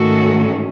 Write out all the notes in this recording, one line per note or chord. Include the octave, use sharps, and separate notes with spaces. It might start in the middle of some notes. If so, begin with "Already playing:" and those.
Already playing: G#2 D#3 A3 C#4 F#4 A4